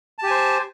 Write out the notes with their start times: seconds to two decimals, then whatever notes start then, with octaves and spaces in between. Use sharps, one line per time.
0.19 A5
0.23 G4
0.27 G#5
0.31 C5